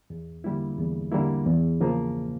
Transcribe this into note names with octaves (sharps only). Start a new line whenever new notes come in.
E2
D3 G3 A#3 E4
E2
D3 G3 A#3 E4
E2
C#3 F3 A#3